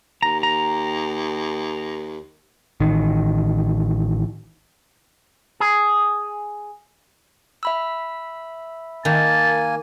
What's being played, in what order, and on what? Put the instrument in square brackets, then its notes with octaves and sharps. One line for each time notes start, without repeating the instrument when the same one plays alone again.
[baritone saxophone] D#2 [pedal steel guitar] A#5
[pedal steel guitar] A#5
[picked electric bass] A1 D#3
[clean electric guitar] G#4
[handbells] E5 B5 E6
[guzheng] D#3 [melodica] A#3 G#5 [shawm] A5